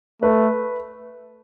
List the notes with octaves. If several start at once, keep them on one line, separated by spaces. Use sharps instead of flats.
A3 B4